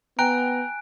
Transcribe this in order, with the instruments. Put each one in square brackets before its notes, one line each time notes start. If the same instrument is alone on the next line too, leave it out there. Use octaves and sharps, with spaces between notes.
[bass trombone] B3 [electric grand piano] G5 A#5 [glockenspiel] G#5 F#6 D7